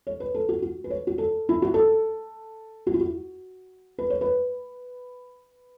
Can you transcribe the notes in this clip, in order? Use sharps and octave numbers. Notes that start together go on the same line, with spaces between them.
C#5
B4
A4
F#4
F#4
B4
C#5
F#4
A4
E4
F#4
A4
F#4
E4
F#4
B4
C#5
B4